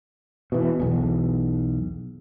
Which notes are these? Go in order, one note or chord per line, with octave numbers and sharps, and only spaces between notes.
B2 E3
B1 E2